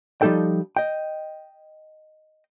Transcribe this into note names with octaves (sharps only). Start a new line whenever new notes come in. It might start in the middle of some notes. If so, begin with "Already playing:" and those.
F3 G3 D#4 A4 G5
D#5 G5